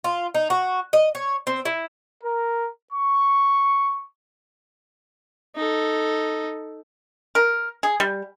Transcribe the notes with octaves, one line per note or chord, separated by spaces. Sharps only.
F4
D#4
F#4
D#5
C#5
C4
E4
A#4
C#6
D#4 A4
A#4
G#4
G3